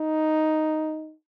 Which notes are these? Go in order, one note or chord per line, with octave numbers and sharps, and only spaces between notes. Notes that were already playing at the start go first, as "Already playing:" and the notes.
Already playing: D#4